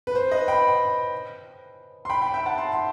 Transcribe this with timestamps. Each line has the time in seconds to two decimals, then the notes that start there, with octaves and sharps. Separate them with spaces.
0.07 B4
0.15 C5
0.31 B4 D#5
0.48 G5 B5
2.05 C6
2.09 G5 B5
2.21 G5 B5
2.34 E5 G5
2.46 F#5 A5
2.58 A5 C6
2.72 C6